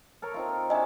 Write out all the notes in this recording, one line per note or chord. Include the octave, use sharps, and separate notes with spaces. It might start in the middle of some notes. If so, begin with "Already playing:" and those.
A4 A#4 C#5
C4 D#4 F4
D4 F#4 D#5 E5 G#5